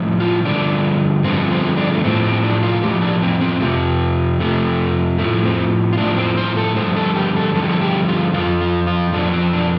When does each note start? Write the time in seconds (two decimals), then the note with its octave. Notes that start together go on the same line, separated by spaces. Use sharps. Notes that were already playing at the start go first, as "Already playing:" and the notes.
Already playing: A2 F3
0.20 F4
0.45 G2 D3 F3 D4
1.24 G2 D3 F3 C4
1.52 C4
1.77 D4
1.94 A3
2.04 A2 F3 C4
2.24 C4
2.44 D4
2.63 F4
2.83 A2 F3 G4
3.02 D4
3.22 C4
3.41 C4
3.61 F2 C3 F3
4.40 F2 C3 F3 A3
5.18 A2 F3 A3
5.45 C4
5.93 F4
5.97 A2 F3 D4
6.17 C4
6.37 C5
6.57 A4
6.76 G2 D3 F3 C5
6.96 A4
7.16 G4
7.36 A4
7.55 G2 D3 F3 A4
7.63 G4
7.69 A4
7.81 G4
8.08 F4
8.34 F2 F3 F4
8.61 F4
8.87 F4
9.13 F2 F3 D4
9.33 C4
9.53 D4